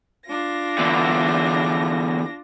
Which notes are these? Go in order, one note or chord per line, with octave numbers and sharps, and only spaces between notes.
D4 F4 A#6
E2 D3